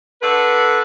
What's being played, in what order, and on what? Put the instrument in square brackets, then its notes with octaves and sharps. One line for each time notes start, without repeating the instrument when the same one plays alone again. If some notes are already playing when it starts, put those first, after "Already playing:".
[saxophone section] D3 A4 B4